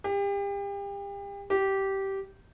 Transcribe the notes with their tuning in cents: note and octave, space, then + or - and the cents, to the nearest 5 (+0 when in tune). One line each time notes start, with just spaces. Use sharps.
G4 +35
G4 -15